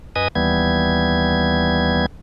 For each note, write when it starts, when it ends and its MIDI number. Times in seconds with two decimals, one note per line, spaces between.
0.16 0.28 42
0.16 0.28 71
0.16 0.28 75
0.16 0.28 80
0.16 0.28 87
0.35 2.06 39
0.35 2.06 52
0.35 2.06 55
0.35 2.06 59
0.35 2.06 92